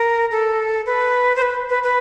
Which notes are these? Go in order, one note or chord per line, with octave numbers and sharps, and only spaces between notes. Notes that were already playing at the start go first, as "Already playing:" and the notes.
Already playing: A#4
A4
B4
C5
B4
B4
B4